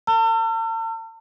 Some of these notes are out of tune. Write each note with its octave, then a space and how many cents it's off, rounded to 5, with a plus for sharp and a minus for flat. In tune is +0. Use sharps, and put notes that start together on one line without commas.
A5 +45 E6 +45